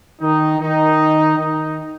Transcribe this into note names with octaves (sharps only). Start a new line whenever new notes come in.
D#3 D#4
D#3 D#4
D#3 D#4